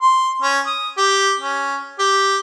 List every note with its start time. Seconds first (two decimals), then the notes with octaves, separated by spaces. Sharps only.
0.01 C6
0.42 C#4
0.66 D#6
0.97 G4
1.39 C#4
1.99 G4